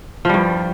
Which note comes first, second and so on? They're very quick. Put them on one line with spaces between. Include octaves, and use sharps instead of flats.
F3 G3 G2